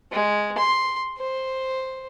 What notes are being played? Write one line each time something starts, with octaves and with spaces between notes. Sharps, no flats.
G#3
C6
C5